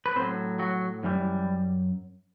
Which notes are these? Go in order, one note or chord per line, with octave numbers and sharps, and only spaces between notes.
B4
A2 F#3 C4 C5
F#3 F#4
F#2 E3 G3